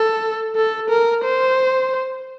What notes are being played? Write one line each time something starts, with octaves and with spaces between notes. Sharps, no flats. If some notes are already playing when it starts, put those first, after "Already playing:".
Already playing: A4
A4
A#4
C5